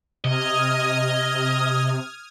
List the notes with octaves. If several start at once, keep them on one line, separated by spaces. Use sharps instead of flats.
C3 D#5 D#6 F6 G#6